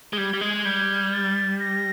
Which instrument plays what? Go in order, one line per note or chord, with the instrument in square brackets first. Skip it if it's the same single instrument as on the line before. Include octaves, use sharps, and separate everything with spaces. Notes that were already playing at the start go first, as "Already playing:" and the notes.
[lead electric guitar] G#3
[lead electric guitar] G3 [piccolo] G#6
[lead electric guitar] G3
[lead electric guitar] G#3 [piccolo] G#6
[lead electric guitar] G3 [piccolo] G#6
[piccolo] A6
A#6